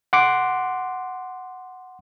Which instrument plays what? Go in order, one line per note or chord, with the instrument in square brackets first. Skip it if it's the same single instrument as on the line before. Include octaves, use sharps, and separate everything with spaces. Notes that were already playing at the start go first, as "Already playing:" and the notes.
[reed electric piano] F#5 C6 D6